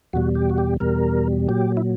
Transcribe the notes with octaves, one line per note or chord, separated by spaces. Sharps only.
E2 B2 G3 F#4
G4
F#4
G4
E2 B2 G3 A#4
A#2 F#3 G4
E4